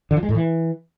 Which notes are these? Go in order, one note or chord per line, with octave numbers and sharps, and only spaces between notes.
D3
F3
G#3
A2
E3